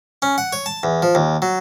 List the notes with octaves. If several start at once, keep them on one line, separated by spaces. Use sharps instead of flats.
C#4
F#5
C#5
A5
E2
F3
D#2
F#3